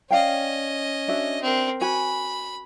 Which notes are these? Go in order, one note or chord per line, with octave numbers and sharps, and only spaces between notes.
C#4 D5 D#5 F5 G5
D4 F#4 E5
C4 A#4
F#4 G#5 B5